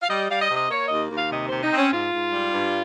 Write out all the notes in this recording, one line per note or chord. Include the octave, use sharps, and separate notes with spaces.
F5
G3 D#5
G3 F5
D#5
C3 D#5
A#3 C#5
D#5
D#2
D#2
F5
C3 D#5
C5
C3
D#4
C4
C#4
G#2 F4
G#2
G3
G2